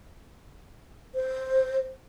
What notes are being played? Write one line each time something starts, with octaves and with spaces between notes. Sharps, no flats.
C5